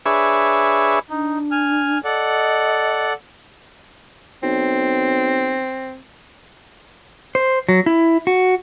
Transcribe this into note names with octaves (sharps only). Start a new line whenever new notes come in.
D4 G#4 B4 C#5 E5
D4 D#4
G#5 F6
A4 D5 D#5 F#5
B1 C4
C5
F#3
E4
F#4